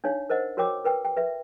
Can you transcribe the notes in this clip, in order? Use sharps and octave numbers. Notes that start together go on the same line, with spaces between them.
D4 D#4 C#5 F5
A#4 C5 D#5 F#5
F#4 A#4 C#5 G5 D6
A#4 B4 G5
G5
B4 E5